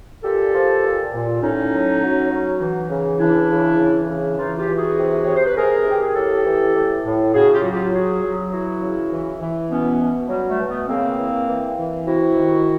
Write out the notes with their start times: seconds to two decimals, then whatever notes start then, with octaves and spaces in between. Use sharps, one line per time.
0.23 A#2 G4 A4
0.53 F3
0.83 A#2
1.13 A#2
1.42 A2 C#4 D#4
1.72 F#3
2.02 F#3
2.30 F#3
2.61 E3
2.90 C#3
3.19 E3 D4 E4
3.50 C#3
3.78 E3
4.09 C#3
4.38 E3 D#4 F4
4.57 F4 G4
4.67 E3
4.77 F#4 G#4
4.98 C3
5.24 C3 C#5
5.35 C5
5.46 B4
5.56 C3 G#4 A#4
5.85 D#3
5.91 G4
6.03 G#4
6.15 A2 G4 A4
6.45 E3
6.74 A2
7.05 A2
7.34 C#3 F#4 G#4
7.53 F4 G4
7.63 F#3 F#4
7.73 F4 G4
7.93 C#3 F#4 G#4
8.23 F#3
8.51 E3 E4 F#4
8.82 C#3
9.11 E3
9.41 E3
9.70 B2 B3 C#4
10.00 B2
10.29 F#3 G3
10.49 G3 A3
10.59 B2
10.69 A3 B3
10.88 C#3 A#3 C4
11.18 E3
11.48 E3
11.78 E3
12.07 C3 E4 F#4
12.36 D#3